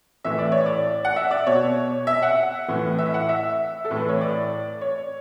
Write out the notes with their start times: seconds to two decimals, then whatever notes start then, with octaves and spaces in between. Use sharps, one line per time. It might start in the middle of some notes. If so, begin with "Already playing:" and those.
0.24 A2 E3 E5
0.38 D5
0.52 C#5
0.66 D5
1.05 F#5
1.16 E5
1.31 D5
1.46 B2 C#5
2.07 E5
2.22 F#5
2.68 A2 E3
2.98 E5
3.14 F#5
3.29 E5
3.85 A4
3.91 A2 E3
3.97 B4
4.09 C#5
4.21 D5
4.81 C#5